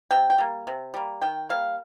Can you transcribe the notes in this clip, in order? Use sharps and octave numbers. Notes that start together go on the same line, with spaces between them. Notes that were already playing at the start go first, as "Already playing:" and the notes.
C3 G5
G5
G3 A#3
C3
G3 A#3
D#3 G5
G3 A#3 F5